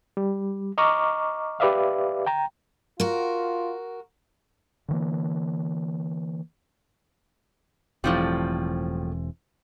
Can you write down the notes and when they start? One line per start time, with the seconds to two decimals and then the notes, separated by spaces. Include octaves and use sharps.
0.17 G3
0.78 D#5 A#5 C#6 D6 F6
1.60 G4 B4 D5 E5 F5
2.26 G5 A#5
3.00 F4 F#4 A#4
4.88 D3 E3 A#3
8.04 E1 A2 E3 F3 G3 C4